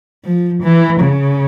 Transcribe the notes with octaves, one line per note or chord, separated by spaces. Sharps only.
F3
E3
C#3